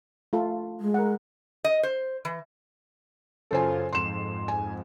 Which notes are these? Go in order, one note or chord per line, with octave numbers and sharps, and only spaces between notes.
A3 F4 A4
G#3
A#4 F#5
D#5
C5
E3
F#2 C#3 F4 A4 C5 G#5
F2 G#2 C6 E7
G#5